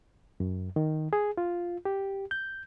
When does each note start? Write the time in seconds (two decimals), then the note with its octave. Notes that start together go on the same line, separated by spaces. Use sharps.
0.40 F#2
0.76 D#3
1.13 G#4
1.38 F4
1.85 G4
2.31 G6